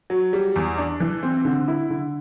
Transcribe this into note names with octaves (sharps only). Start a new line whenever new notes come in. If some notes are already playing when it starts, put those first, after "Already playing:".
F#3
G3
E2
D4
E3
C4
D3
E4
D3